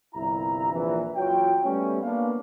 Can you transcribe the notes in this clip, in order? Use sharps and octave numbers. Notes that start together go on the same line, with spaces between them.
G1 C2 E4 A#5
A#1 E3
F#1 F#3 F4 F#4 C#5 G5
G3 A3 B3 C#4
A#3 B3 D4 F5